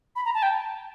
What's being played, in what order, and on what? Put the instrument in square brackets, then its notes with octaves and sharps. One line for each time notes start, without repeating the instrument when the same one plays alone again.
[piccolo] B5
A#5
A5
G5